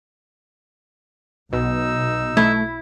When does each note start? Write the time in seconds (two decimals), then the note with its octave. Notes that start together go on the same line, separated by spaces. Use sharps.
1.53 B1 B2 D#4 E6
2.37 A3 E4